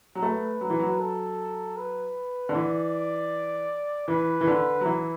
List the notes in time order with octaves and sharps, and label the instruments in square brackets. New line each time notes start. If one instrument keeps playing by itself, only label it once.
[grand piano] F#3
[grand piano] A3 [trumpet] B4
[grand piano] F#3
E3
F#3
[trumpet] A4
B4
[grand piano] D3
[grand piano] E3 [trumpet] D5
[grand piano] E3 [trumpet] B4
[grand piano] E3
D3
F#3
[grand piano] E3 [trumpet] E4